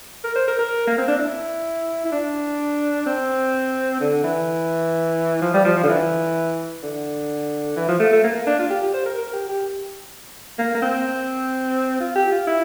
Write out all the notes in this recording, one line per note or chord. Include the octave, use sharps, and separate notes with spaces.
A#4
C5
A#4
A#4
A#3
C4
D4
E4
E4
D4
C4
D3
E3
F3
G3
F3
F3
D3
E3
D3
E3
F3
A3
A3
A#3
A#3
D4
F4
G4
G4
C5
A#4
A#4
G4
G4
A#3
A#3
C4
F4
G4
F4
E4